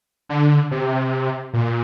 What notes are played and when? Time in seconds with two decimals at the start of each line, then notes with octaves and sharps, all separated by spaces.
0.29 D3
0.71 C3
1.54 A#2